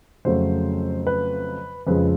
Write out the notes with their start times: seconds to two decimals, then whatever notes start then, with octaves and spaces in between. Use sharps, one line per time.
0.25 F2 C#3 F#3 A3 C5
1.07 B4
1.87 F2 C#3 F3 G#3 B4